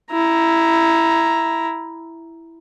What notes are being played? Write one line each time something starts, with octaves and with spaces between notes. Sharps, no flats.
E4 A#5